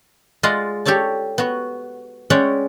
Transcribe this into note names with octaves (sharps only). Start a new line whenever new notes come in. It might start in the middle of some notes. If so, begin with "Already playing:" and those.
G#3 F4 D5 D#5 F5 F#5
G4 A4 C#5 D5 A5
B3 F#4
G#3 C#4 C#5 D5 F#5 G5